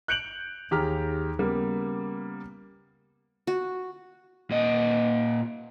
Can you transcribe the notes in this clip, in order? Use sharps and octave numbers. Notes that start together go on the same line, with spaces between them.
F#6 G6 C#7 D7 F7 F#7
D#2 G4 G#4 A#5 F6
C#3 G3 A#3 B3
F#4
A#2 D#5